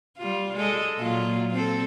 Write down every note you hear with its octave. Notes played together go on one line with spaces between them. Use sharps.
G3 F4
G#3 A4 D#5
A#2 F#3 F4
C4 A4